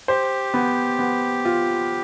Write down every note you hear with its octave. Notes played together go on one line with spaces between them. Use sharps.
G4 C5
B3
B3
F4